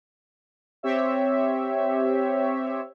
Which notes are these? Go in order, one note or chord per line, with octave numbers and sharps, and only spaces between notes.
C4 G4 C#5 E5